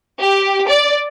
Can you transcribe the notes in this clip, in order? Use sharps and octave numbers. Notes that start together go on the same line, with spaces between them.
G4
D5